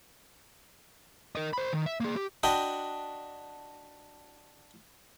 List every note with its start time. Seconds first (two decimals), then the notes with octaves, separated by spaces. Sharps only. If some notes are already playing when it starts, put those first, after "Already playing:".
1.36 A#4 D#5
1.53 C5 B5
1.73 D#3
1.86 E5
2.00 A#3 G#4
2.16 G4
2.43 D4 F#4 D#5 G5 B5